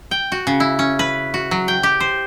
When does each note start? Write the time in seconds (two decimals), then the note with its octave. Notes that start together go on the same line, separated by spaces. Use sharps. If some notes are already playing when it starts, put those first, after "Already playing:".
0.11 G5
0.32 F#4
0.47 C#3
0.60 E4
0.79 C#4
0.99 B4
1.34 F#4
1.51 F#3
1.68 G5
1.83 G4
2.00 C5